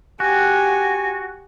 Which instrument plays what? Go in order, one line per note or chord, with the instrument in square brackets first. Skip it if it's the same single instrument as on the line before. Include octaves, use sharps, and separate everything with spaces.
[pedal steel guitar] F#4 [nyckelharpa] G4 G#5